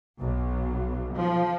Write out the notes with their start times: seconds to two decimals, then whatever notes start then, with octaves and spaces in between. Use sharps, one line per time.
0.20 B1
1.16 F3